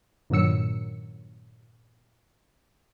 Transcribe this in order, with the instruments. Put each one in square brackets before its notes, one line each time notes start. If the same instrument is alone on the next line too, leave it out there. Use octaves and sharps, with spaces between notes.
[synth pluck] G2 A#2 D#3 F#3 E6 C#7